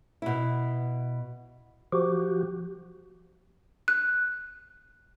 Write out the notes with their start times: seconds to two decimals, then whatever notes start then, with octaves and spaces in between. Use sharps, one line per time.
0.22 B2 E4
1.92 F3 F#4 G4
3.88 F#6